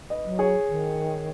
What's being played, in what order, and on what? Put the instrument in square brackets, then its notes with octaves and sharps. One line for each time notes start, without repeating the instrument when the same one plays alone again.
[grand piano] B4 D#5
[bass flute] F#3
[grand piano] G#4 C#5
[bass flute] D#3